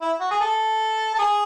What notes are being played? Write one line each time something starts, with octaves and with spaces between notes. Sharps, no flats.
E4
F#4
G#4
A4
A4
G#4